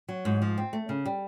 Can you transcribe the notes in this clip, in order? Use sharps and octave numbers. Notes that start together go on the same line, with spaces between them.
F#3
G#2
F3
C4
A3
C#3
G3